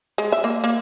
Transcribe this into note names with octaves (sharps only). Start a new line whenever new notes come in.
G#3
E5
A#3
A#3